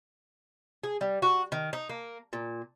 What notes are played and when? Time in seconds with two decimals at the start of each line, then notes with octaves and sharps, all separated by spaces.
0.83 G#4
1.01 G3
1.22 F#4
1.52 D#3
1.73 D#4
1.89 A#3
2.33 A#2